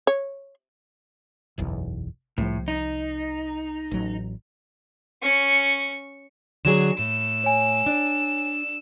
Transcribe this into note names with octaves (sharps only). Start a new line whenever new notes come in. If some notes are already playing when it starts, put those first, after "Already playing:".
C#5
F#1 B1 E2
C2 A2 F3
D#4
A1 F#3
C#4 C#6
D3 F#3 G#4 E7
A2 E6
C#5 G#5
D4